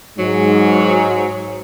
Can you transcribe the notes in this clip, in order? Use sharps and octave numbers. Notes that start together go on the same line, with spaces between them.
G#2 F#3